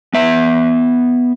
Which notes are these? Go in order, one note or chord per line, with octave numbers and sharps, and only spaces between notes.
B3 E5